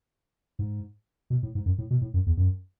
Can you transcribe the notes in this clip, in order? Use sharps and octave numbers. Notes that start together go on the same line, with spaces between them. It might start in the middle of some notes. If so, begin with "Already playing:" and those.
G#2
B2
A2
G#2
F#2
A2
B2
A2
F#2
E2
F#2